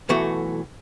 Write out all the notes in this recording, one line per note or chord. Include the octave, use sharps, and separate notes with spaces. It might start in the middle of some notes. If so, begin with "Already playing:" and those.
B1 E3 A3 F#4